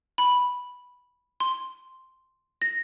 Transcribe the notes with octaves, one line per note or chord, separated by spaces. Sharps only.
B5
C6
A#6